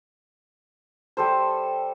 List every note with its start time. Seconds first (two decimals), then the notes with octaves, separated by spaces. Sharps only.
1.17 G3 A4 C5